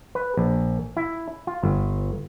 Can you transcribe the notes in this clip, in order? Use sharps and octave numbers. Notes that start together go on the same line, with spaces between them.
B4
A#1
E4
F4
G1